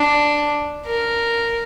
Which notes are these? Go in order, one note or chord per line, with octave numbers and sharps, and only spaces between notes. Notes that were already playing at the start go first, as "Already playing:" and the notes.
Already playing: D4
A#4